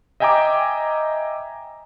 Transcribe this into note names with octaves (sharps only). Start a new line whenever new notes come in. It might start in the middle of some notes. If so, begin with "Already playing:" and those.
D#5 E5 G5 G#5 A#5 D6